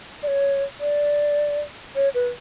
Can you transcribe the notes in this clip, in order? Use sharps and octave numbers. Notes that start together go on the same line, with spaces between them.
D5
C#5
D5
C#5
B4